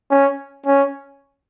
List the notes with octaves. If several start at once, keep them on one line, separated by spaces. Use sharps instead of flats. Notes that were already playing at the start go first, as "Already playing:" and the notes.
C#4
C#4